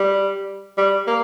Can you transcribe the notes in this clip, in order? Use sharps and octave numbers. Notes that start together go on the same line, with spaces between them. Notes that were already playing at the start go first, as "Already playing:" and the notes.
Already playing: G3
G3
A#3